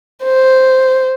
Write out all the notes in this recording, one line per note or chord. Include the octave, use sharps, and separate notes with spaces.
C5